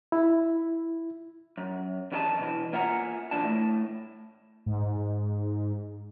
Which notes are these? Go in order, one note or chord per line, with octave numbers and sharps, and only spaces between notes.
E4
F#2
E2 D#3 F#4 A#4 D#5 A5
B2 E3
A#3 F4 E5 F#5 G#5 A#5
B1 E2 A#2 D3 D4 A5
A2 A3
G#2